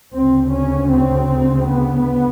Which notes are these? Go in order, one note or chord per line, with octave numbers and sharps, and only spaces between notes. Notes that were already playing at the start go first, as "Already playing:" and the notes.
D2 C#3 C4
C#4
C4
B3